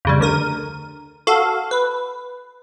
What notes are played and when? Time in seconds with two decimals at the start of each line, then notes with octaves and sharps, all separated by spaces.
0.05 F2 C#3 G3
0.19 D2 D3 A#4 D#7
1.27 F#4 A4 F5
1.71 B4